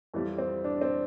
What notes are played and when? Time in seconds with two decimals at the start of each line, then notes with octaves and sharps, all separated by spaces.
0.14 F2 E3 G3
0.38 C4
0.64 D4
0.81 C4